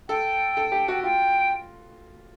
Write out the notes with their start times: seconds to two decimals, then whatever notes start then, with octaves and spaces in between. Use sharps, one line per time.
0.09 A4 G5
0.57 A4
0.72 G4
0.88 F#4
1.03 F4 G5